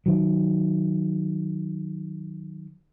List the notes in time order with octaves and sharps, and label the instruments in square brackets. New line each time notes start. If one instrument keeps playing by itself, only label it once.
[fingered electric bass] D#3 F#3